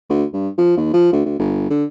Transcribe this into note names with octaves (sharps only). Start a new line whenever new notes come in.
D2
G2
F3
D#2
F3
D2
D2
G1
D3